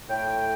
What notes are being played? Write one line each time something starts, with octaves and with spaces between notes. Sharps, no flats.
A2 G5